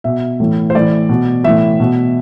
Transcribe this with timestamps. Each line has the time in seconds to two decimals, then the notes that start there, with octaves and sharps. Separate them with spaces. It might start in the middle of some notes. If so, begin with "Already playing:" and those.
0.04 B2 E5
0.40 A2 E3
0.70 C5
0.75 A2 E3 D5
1.09 B2
1.44 A2 E3 E5
1.80 B2